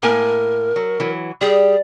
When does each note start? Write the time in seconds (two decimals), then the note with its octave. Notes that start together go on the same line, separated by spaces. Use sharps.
0.03 A2 A#3 A#4 G#5
0.76 F#3
1.00 E3 F#3
1.41 G3 G#4